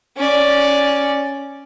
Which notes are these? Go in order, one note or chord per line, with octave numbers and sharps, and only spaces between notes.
C#4 D5